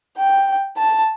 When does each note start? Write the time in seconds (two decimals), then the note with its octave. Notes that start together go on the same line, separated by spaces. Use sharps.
0.17 G5
0.77 A5